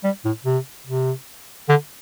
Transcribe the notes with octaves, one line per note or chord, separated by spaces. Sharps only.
G3
A2
C3
C3
D3